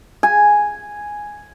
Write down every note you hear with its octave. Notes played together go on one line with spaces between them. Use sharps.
G#5